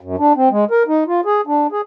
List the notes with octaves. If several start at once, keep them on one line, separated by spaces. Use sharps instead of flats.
F#2
D4
C4
G#3
A#4
D#4
F4
G#4
D4
G#4